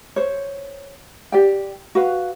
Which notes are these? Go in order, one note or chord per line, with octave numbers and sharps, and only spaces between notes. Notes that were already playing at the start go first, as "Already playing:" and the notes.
C5 C#5
G4 D5 G5
F#4 B4 F5